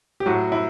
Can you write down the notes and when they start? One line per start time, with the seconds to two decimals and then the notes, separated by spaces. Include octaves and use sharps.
0.20 G4
0.26 A2 F#3 F#4
0.52 E4